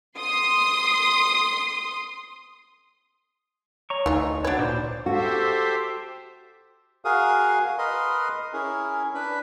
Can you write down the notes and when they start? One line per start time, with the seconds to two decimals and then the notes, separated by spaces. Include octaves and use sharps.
0.18 C6 D#6
3.90 C#5 A#5 C#6
4.06 D2 E3 D#4 F4
4.45 F#3 D4 B4 C#5 A6
4.59 A#2 C5 D5
5.06 F#4 G4 A4 C5 E5
7.05 F#4 G#4 A#4 F5 D#6
7.78 A#4 B4 D#5 C6 D#6
8.53 C#4 E4 G#4 A#4
9.15 D4 B4 B5